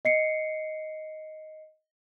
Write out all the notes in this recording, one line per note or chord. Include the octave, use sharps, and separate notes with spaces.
D#5 C7 C#7